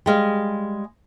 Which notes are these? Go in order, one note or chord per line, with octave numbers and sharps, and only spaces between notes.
G3 G#3 F5